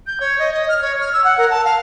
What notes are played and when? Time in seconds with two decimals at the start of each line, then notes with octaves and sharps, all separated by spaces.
0.06 G6
0.20 C#5
0.38 D#5
0.52 D#5
0.68 F6
0.81 C#5
1.00 F6
1.12 E6
1.24 F#5
1.37 A#4
1.49 A5
1.64 F5